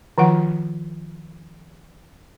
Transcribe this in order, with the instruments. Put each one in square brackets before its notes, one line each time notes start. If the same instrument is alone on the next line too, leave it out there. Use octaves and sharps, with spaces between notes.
[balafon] D#3 F3 F4 F#5